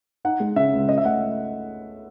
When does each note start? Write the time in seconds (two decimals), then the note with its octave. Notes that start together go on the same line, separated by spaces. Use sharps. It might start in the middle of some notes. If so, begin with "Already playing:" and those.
0.25 D#4 F#5
0.40 G#3
0.56 C#3 E5
0.73 C#2
0.89 C#4 D#5
0.98 E5
1.05 A3 F#5